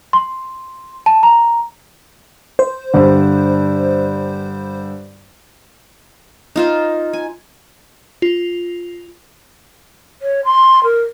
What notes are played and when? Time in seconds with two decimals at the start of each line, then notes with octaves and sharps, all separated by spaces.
0.13 C6
1.06 A5
1.23 A#5
2.59 C5
2.94 G2 D3
6.56 D#4 F4 C5
7.13 G#5
8.22 F4
10.22 C#5
10.45 C6
10.83 A#4